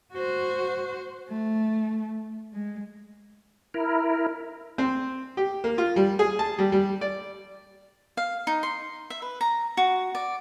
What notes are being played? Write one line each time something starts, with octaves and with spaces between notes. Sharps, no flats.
F#4 C5
A3
G#3
E4 A#4
C4
G4
A#3
F4
G3
G#4
A5
G3
G3
D5
F5
D#4
C6
E5
B4
A#5
F#4
D5